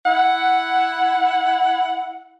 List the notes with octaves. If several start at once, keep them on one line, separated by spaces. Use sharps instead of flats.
E4 F#5